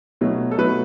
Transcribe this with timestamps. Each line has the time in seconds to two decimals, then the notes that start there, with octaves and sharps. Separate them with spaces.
0.21 B2 F#3 A3
0.51 A4
0.58 B2 F#3 A3 B4